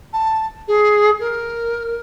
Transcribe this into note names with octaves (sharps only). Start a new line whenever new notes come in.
A5
G#4
A#4